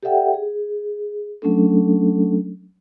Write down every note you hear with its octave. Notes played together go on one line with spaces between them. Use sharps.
G4 A4 D5 E5 F#5 G5
G#4
F#3 A3 C#4 D4 A4